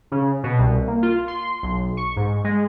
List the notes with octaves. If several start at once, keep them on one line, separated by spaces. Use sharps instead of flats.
C#3
B2
C2
A#3
F4
C6
B1
C#6
G#2
G#3